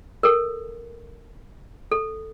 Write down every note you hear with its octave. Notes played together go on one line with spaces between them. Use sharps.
A4 A#4
A4